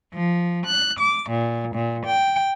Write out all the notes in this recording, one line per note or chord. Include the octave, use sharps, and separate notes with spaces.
F3
F#6
D6
A#2
A#2
G5